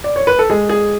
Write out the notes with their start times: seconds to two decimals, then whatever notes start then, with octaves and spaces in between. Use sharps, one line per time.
0.04 D5
0.16 C#5
0.27 B4
0.39 A4
0.50 G#3 G#4
0.69 G#4